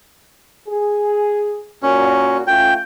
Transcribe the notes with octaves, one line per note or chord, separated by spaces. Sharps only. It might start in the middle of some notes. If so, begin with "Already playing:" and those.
G#4
A#2 C#4 F#4
A3 C#4 F4 G5